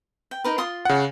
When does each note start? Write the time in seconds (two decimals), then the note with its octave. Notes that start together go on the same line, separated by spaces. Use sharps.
0.31 G5
0.44 D#4 A#4 B4
0.58 F4 C6 D#6
0.85 C#3 F#5